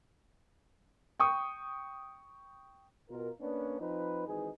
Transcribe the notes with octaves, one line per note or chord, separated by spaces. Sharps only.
G5 C#6 D#6
B2 F4 A#4
A#3 B3 C#4 D4
F3 C4 D#4 B4
G#1 G#2 E3 D#4 G#4